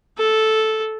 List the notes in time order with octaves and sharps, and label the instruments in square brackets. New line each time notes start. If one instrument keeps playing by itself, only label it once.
[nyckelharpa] A4